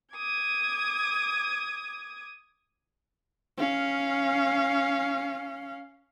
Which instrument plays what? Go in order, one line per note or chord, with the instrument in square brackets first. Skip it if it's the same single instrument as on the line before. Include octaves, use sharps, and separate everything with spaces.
[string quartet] D6 D#6 G#6
[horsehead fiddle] C#4 F5